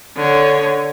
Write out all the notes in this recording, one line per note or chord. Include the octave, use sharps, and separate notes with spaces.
D3 C#5